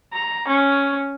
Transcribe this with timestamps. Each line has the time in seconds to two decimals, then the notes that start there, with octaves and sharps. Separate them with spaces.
0.13 A#5
0.48 C#4